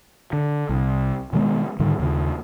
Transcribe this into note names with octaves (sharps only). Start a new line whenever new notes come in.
D3
C2
B2 D#3 G#3 B3
G#2 D3 D#3 G3
D#2 C#3